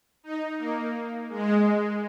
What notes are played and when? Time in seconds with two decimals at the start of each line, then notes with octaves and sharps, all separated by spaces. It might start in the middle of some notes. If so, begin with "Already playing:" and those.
0.24 D#4
0.59 A#3
1.29 G#3